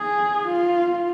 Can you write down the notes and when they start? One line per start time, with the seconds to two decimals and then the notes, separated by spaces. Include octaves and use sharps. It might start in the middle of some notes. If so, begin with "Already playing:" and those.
Already playing: G#4
0.48 F4